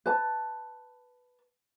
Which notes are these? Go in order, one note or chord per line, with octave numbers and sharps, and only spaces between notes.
B4 A5